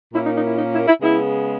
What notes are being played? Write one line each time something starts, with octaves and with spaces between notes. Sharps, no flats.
A#2 A#3 C#4 E4
D#4
D#4
E4
D#4
E4
E4
C#3 G#3 B3 E4